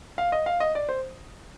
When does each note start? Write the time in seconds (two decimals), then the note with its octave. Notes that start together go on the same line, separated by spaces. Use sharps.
0.18 F5
0.32 D#5
0.46 F5
0.60 D#5
0.75 D5
0.89 C5